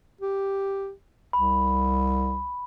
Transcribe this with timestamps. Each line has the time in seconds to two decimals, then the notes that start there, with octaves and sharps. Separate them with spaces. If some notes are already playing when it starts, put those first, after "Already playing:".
0.21 G4
1.33 C2 B5